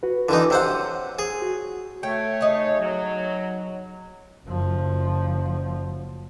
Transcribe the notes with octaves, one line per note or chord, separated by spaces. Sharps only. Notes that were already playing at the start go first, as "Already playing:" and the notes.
F#4 B4
D3 E3 D#4 E4 B4
C3 C5 C#5 F#5 C6 E6
G#4
F#4
A3 C#5 G5
D#4 G#4
F#3
F#1 F3